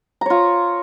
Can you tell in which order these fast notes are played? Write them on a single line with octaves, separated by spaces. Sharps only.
A#5 C#5 F4